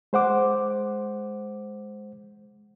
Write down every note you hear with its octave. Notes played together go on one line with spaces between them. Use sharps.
G#3 C5 F#5 D6